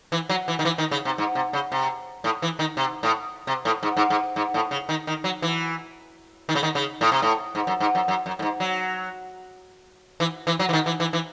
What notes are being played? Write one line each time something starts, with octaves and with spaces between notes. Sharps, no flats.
E3
F#3
E3
D#3
E3
D#3
C#3
C3
G#2
C3
C#3
C3
A2
E3
D#3
C3
A2
C3
A2
G#2
G#2
G#2
G#2
A2
C#3
D#3
D#3
F#3
E3
D#3
C#3
D#3
C#3
A2
C3
A2
G#2
F#2
G#2
F#2
F#2
F#2
A2
G#2
F#3
E3
E3
F#3
E3
D#3
E3
E3
E3